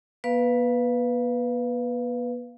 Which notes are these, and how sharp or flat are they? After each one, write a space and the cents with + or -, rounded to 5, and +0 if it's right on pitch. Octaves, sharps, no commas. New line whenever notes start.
B3 -45 B4 +0 F5 +0